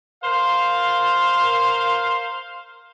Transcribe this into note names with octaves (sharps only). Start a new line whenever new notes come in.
A#4 C5 F5